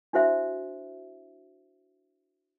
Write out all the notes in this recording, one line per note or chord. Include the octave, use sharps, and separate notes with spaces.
D4 E4 F#4 C5 E5